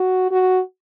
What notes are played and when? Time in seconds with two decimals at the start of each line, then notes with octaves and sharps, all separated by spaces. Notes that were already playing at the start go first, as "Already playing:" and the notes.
Already playing: F#4
0.31 F#4